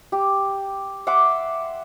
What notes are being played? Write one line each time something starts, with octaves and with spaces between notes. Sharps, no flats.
G4
E5 F#5 C6 D6